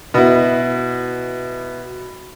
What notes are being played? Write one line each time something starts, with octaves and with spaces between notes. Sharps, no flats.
B2 E4